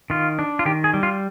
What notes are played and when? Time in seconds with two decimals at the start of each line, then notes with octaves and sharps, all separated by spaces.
0.10 D#3 F4
0.39 D4
0.59 F4
0.65 D#3 G4
0.84 G#4
0.94 G3
1.03 F4